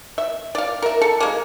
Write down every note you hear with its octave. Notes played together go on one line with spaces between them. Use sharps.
E5
D5 F5
A#4 E5
A4
G#3 A#3